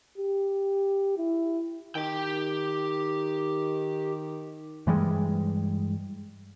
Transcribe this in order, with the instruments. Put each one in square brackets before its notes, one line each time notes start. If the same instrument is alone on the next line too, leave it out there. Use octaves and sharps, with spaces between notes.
[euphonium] G4
E4
[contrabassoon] D#3 [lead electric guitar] G4 G5
[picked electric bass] G2 E3 G3 G#3